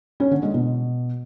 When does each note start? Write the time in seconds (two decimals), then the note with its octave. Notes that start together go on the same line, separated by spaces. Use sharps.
0.20 C#4
0.31 D3
0.43 G#3
0.54 B2